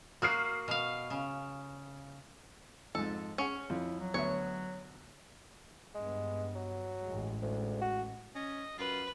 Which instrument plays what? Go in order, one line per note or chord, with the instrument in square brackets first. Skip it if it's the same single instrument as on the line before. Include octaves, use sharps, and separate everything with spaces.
[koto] A#3 F#4 [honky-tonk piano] D#6 F6 C7
[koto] B2 F5
C#3
[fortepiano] F2 G#2 [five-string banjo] A4
[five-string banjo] C#4 [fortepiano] G#4 C#5 F#5
[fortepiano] F2 [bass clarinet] E4
[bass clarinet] F#3
[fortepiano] D2 B3 E5 [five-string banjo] C#5
[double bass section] G2 B3 [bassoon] G#3
[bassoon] F#3
[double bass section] A1 G#3
[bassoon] D2
F#4
[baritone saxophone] C#4 [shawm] D#5
[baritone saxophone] F#2 [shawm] F4 [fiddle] B4